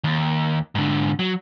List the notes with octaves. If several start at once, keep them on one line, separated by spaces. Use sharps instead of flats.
D#2
G#2 D3
F#3